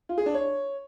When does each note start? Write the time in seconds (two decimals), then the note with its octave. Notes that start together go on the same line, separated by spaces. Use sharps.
0.09 F4
0.18 G#4
0.26 D4
0.34 C#5